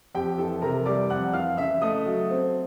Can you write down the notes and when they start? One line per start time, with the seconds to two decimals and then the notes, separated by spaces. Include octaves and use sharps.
0.15 F2 G4 G5
0.38 E3 A4 A5
0.62 C3 A#4 A#5
0.85 G3 D5 D6
1.10 F2 F#5 F#6
1.33 E3 F5 F6
1.57 C#3 E5 E6
1.81 A3 D#5 D#6
2.06 F#3
2.30 C4